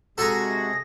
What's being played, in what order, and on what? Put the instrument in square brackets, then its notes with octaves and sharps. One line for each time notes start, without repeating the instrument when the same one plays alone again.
[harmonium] C3 G#3 [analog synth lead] F#4 [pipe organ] G#4 A#6 [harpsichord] A4 G#5 A#5